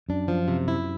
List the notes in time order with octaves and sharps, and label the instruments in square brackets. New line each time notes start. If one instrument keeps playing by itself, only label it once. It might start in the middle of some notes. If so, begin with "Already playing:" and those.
[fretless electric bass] F#2 [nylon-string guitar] D4
[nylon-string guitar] F3
C3
E4